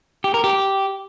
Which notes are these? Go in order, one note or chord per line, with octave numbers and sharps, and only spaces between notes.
G4
A#4
G4